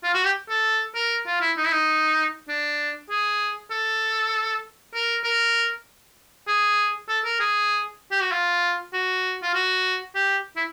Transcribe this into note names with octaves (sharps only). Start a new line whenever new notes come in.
F4
F#4
G4
A4
A#4
F4
E4
D#4
E4
D#4
D4
G#4
A4
A#4
A#4
G#4
A4
A#4
G#4
G4
F#4
F4
F#4
F4
F#4
G4
E4